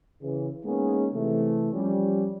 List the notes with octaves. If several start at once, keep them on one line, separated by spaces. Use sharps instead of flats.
C#3 E3
G#3 A#3 B3 C#4 D#4 G#4
C3 E3 A3
F3 G3 C#4